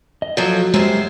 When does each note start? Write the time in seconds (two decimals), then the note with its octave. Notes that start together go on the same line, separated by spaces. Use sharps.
0.22 D#5
0.37 F3 F#3 A4
0.74 F#2 G#3 G4 C5